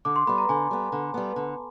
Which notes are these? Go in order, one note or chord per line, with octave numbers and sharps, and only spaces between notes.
D3 D6
C6
G3 B3 B5
A#5
D3 G#5
G3 B3
D3
G3 B3
D3